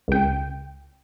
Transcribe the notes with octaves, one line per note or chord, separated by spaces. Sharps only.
C#2 G5